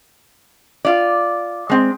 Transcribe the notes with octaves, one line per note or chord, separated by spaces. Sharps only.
F4 D5
G#3 C4